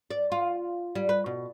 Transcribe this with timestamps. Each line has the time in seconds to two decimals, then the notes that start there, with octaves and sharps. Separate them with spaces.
0.11 D5
0.32 F4
0.95 G3
1.09 B4
1.26 B2